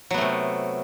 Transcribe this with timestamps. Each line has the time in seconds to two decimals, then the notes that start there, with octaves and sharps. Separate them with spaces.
0.11 F#3
0.14 B3
0.18 A3
0.21 C3